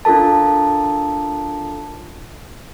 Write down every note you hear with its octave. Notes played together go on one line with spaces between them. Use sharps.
D4 F4 A4 A#4 A5